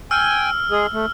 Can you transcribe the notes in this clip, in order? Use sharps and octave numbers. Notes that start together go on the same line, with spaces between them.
G5 G#5 E6 F6
G#3 G#4
A3